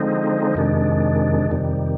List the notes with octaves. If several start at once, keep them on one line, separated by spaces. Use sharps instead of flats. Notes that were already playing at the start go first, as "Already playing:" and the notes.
Already playing: D3 F3 G#3 C4 D#4
F2 C3 D#3 G#3 D4
F2 C3 D#3 G3